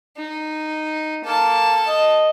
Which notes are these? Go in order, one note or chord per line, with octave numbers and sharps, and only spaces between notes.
D#4
A#3 A4 A5
D#5